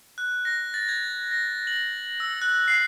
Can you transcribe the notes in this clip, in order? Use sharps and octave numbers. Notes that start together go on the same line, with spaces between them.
F#6
A#6
A6
G#6
A#6
F#7
E6
F#6
C7